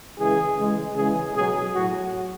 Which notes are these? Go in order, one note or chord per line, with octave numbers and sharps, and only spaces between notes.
C#3 E3 G#3 G#4
C#3 E3 G#3
C#3 E3 G#3 G#4
B2 F#3 G#4
A2 F#3 F#4